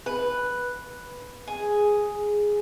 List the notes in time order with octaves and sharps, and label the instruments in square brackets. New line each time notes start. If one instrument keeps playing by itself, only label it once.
[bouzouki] B4
G#4